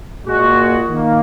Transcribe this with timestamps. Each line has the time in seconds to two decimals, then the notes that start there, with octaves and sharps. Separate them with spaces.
0.26 A#2 G#3 F#4
0.90 D#3 A#3